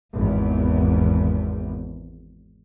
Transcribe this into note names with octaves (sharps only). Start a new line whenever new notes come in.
G#1 E2